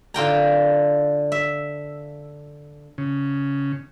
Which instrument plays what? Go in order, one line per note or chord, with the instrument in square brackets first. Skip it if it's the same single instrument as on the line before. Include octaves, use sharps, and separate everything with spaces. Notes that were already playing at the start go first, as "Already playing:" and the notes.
[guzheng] D3 F4 G5 A#5
E5
[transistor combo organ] C#3